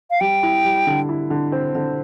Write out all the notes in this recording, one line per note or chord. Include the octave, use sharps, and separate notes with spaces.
F5
G3 G5
E4
G3
D3
E4
D3
C4
D3